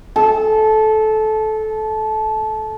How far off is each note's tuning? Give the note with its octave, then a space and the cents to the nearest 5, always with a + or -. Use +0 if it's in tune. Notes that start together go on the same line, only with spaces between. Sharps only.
A4 -20